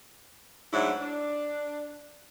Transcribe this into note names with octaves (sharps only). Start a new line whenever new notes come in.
G#2 F#3 A3 D4 E4
D4